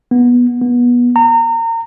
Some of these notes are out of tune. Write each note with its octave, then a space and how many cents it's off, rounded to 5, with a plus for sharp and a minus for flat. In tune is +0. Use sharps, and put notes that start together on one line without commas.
B3 -15
B3 -25
A#5 -30